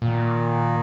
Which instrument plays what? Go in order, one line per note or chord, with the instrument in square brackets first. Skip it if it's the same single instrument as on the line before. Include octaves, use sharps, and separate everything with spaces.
[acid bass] A#2 [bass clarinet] D#3